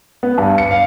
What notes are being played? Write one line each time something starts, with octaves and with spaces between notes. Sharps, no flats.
B3
G2
C#7
F5